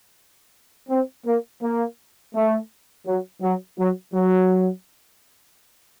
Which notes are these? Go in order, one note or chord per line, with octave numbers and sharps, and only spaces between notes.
C4
A#3
A#3
A3
F#3
F#3
F#3
F#3